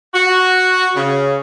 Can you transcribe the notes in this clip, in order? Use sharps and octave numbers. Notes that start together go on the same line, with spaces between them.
F#4
C#3